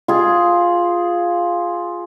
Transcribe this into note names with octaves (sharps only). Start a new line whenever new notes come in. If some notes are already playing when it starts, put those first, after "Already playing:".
F4 G#4